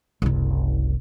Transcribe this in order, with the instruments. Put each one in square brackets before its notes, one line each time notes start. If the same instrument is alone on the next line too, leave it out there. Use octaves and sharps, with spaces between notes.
[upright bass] F#1 C2